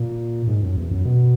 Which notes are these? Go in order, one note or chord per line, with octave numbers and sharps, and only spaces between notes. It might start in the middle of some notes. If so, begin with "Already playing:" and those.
Already playing: A#2
G#2
F#2
E2
F#2
B2